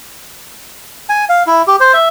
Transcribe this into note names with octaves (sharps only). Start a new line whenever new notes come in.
G#5
F5
E4
G4
C5
E5